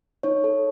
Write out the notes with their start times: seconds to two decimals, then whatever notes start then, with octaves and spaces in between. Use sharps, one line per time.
0.23 D#4 C#5
0.44 A4